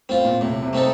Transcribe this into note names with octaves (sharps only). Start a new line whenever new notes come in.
A2 C4 F4
A#2
A2 C3
C3
A3 C4 D#4 A4